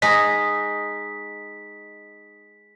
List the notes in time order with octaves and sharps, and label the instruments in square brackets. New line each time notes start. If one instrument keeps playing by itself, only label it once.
[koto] G#3 D#4 [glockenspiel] B6